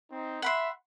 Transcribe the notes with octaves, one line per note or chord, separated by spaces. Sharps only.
C4 D#4
E5 F#5 B5 C6